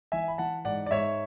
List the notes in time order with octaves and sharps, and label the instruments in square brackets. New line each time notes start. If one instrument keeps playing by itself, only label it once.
[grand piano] E3 E5 G#5
B5
E3 F#5 A5
G#2 D5 F#5
D5
G#2 C#5 E5